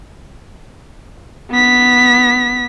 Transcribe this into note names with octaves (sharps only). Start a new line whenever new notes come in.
B3 B6